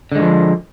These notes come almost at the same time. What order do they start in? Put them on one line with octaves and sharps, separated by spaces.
D3 G#3 D#3 F3